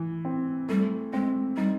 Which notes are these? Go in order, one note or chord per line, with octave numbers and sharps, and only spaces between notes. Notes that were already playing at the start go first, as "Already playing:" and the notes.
Already playing: E3
C4
G3 A3
G#3 C4
G3 D#4